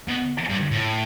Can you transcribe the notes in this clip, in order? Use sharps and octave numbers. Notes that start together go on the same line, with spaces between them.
B2
G2
A2